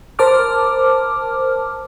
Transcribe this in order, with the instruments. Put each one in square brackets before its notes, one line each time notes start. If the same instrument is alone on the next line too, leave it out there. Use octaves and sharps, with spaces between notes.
[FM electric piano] A#4 C5 A5 D6 F6